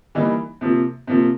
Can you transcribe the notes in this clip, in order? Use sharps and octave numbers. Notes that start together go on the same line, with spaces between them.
E3 G3 A#3 D#4
C3 F3 A#3
C3 F3 A#3